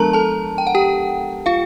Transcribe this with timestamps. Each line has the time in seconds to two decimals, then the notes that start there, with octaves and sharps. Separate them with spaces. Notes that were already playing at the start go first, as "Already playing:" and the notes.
Already playing: F3 G#3 B3 D4 A4 A#4 A5 A#5
0.13 A4 A5
0.58 G5
0.67 F#5
0.75 G4 G5
1.46 F4 F5